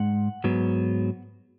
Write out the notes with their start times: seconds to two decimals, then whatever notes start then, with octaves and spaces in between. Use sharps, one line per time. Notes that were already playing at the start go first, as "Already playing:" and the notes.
Already playing: G#2 G#3 F#5
0.44 G#2 F#3 B3